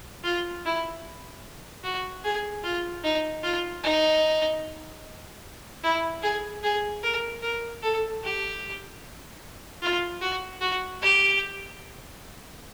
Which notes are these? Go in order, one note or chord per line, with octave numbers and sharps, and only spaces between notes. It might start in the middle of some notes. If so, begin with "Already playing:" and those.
F4
E4
F#4
G#4
F4
D#4
F4
D#4
E4
G#4
G#4
A#4
A#4
A4
G4
F4
F#4
F#4
G4